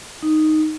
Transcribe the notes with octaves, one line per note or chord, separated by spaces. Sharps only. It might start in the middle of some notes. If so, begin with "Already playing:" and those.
D#4